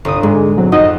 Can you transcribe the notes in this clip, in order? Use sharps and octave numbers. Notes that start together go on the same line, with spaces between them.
G1 C2 D#6
G#2 G#3
B2 F#3 C4
F2 D#4 F#4 D#5